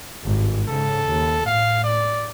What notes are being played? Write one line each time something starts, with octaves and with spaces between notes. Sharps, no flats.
G#1 G2
G#2 C#3 A4
D#2
A2 F5
D5